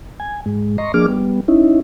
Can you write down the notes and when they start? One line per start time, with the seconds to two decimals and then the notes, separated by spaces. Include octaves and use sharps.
0.20 G#5
0.46 G#2 G#3
0.78 D#5 A#5 C6 C#6
0.94 F3 A#3 D4 G#4 D6 F6
1.08 G3 B3
1.48 C#4 D#4 E4